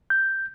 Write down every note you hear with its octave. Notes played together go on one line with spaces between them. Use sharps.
G6